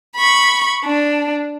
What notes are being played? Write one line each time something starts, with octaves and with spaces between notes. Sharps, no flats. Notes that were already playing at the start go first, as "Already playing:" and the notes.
B5 C#6
D4